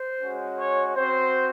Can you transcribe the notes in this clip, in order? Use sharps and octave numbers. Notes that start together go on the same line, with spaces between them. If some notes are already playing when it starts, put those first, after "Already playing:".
Already playing: C5
G#3 C#4 F#4
C#5
C4 F#4 C5